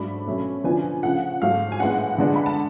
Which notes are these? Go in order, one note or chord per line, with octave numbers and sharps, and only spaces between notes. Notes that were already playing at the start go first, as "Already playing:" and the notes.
Already playing: G#2 F#3 A3 D4 B5
B2 F#3 A3 C#4
D3 F3 B3 D4 G#5
C#3 F3 A3 F#5
G#2 F#3 A3 F5
G#5
A2 G#3 B3 D4 F#5
D3 G#3 B3 D4
B5
A5